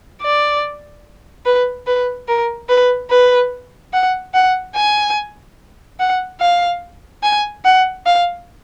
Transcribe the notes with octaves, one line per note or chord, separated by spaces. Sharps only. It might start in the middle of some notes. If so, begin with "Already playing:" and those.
D5
B4
B4
A#4
B4
B4
F#5
F#5
G#5
F#5
F5
G#5
F#5
F5